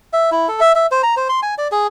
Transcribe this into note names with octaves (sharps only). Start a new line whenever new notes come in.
E5
E4
A4
E5
E5
C5
A#5
C5
C6
G#5
D5
G#4